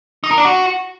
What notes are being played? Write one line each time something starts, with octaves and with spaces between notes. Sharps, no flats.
D#4
A#4
D4
F#4